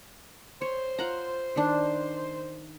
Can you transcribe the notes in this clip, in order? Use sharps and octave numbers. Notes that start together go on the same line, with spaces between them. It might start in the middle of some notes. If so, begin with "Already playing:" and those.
C5 C#5
F4 F#5 A#5
D#3 D4